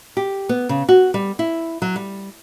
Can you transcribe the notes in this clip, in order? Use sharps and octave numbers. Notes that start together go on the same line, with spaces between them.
G4
B3
C#3
F#4
G3
E4
F#3
G3